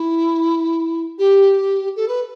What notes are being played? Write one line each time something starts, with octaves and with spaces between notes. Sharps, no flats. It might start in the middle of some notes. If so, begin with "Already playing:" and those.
Already playing: E4
G4
A4
B4